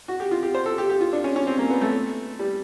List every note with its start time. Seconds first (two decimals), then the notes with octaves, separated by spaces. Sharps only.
0.08 F#4
0.20 G4
0.31 F4
0.43 G4
0.54 C5
0.66 A4
0.78 G4
0.90 G4
1.01 F4
1.13 D4
1.24 C#4
1.36 C#4
1.47 C4
1.59 A#3
1.70 B3
1.81 A3
2.39 G3